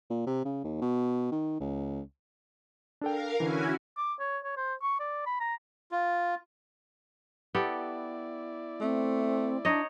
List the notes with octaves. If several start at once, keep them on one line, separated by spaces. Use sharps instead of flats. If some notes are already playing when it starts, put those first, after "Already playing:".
A#2
C3
C#3
D#2
B2
D#3
C#2
D4 A4 A#4 F5 G5
D3 E3 C#4 E4 F#4 G#5
D6
C#5
C#5
C5
C#6
D5
B5
A#5
F4
B3 E4 G4 A4 D5
A3 C4
D4 D#4 C#5 D#5